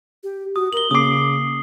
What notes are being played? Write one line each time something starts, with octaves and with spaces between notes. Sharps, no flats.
G4
F#4 D#6
A#4 F#7 G7
C#3 A#3 D6 D#6 C7